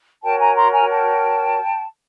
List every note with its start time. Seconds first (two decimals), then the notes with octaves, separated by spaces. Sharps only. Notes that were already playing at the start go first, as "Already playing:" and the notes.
0.23 F#4 A#4 C#5 G5 A5
0.40 G#5 A#5
0.56 A#5 C6
0.72 G#5 A#5
0.89 G5 A5